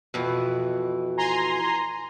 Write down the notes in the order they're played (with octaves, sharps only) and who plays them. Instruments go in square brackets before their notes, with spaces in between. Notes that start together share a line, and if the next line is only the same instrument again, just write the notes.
[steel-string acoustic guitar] F2 B2 E3
[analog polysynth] G#5 A#5 C6